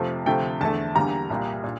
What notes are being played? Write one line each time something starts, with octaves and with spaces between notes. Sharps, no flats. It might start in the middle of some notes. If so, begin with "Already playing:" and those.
Already playing: F2 C3 F3 A3 F5
D2 C3 F3 A3 G5
E2 D3 A3 A5
E2 D3 G3 A#3 A#5
C2 A#2 G3 A#3
A#2